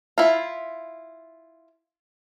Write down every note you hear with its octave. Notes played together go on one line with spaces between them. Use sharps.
E4 F4